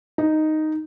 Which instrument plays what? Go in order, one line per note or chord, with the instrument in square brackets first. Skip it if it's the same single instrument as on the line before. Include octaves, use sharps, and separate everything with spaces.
[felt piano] D#4